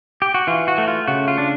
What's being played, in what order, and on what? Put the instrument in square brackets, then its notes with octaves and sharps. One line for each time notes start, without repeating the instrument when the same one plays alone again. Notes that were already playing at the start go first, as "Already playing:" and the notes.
[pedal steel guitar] G4
F#4
E3 F4
F#4
A3
F4
C#3 F#4
F4
D4